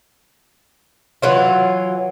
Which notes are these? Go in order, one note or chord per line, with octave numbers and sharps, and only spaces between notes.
E3 F#3 F4